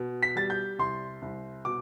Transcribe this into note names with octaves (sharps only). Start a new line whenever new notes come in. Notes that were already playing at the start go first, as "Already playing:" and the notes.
Already playing: B2
B6
G3 A6
G6
C2 C6
C2
B2 D6